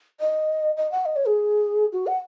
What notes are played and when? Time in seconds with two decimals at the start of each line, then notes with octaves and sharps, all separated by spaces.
0.20 D#5
0.77 D#5
0.92 F#5
1.06 D#5
1.16 C#5
1.26 G#4
1.93 F#4
2.07 F#5